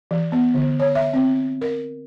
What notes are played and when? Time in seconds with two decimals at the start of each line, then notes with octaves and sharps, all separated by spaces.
0.11 E3
0.32 B3
0.54 D3
0.80 C#5
0.95 E5
1.13 C4
1.61 A#4